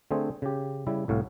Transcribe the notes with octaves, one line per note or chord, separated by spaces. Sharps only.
D3 A3 C4 G#4 C5
C#3 G4
C#3 G3 E4
C2 A2 F#4 F5